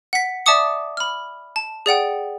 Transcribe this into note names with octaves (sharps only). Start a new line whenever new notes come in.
F#5 B6
D5 E5 A5 D6 D#6 C#7
B5 F6
A5
G#4 D5 F#5 G5